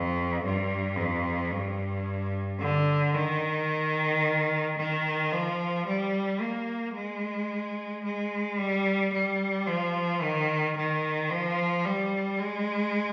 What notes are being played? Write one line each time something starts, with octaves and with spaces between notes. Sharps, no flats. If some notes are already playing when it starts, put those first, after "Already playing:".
Already playing: F2
G2
F2
G2
D3
D#3
D#3
F3
G3
A#3
G#3
G#3
G3
G3
F3
D#3
D#3
F3
G3
G#3